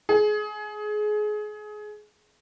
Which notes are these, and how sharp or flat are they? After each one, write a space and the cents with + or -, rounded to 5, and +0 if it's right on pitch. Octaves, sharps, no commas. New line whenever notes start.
G#4 +25